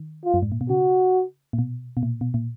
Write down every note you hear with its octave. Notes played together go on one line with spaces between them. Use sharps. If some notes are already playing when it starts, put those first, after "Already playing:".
Already playing: D#3
F4
F#2
G#2
A#2
B2
C#3 F#4
A#2
B2
B2
A#2
B2
A#2